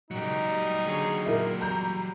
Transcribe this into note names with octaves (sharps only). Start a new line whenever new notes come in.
A#2 C#3 F#3 D#4 G4
G3
D3 G#4 C#5
A#2 A#3 E4 A#4
G3 A#5 G6